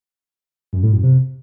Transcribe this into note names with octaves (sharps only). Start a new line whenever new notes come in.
F#2
A2
F#2
C3